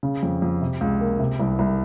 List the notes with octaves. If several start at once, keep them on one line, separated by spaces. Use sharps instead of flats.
C#3
F2
F2
C3
C#2
A#3
C3
C2
C2